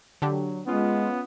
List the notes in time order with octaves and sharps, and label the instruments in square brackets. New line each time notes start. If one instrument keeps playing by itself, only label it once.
[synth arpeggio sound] D3 D4 G4 [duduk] F#3
[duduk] G#3 [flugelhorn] B3 [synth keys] C#4 F4